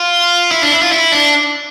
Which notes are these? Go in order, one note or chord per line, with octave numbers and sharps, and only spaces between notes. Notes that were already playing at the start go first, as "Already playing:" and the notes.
Already playing: F4
E4
D4
E4
F4
E4
D4